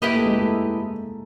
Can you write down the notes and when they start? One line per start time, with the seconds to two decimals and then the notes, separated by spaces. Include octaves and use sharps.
0.02 A#3 E4 G4 B4 D#5
0.14 A3
0.26 G#3
0.38 A3